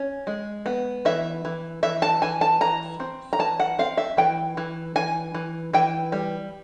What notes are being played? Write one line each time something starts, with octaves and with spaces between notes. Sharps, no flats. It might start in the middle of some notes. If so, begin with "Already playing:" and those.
Already playing: C#4
G#3
B3
E3 E5
E3
E3 E5
A5
E3 G#5
A5
E3 A#5
C4
A#5
E3 A5
F#5
C4 F5
E5
E3 G5
E3
E3 G#5
E3
E3 G5
G3